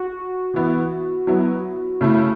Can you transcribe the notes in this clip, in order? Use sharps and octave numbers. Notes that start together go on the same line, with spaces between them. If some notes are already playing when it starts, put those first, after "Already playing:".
Already playing: F#4
E3 B3 E4
F#3 B3 E4
C#3 A3 E4